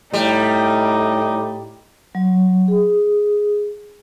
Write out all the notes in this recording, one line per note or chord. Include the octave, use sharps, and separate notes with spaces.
A2 G3 D#4
F#3
G#4